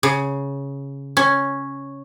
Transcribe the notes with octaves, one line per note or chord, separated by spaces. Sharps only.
C#3
C#4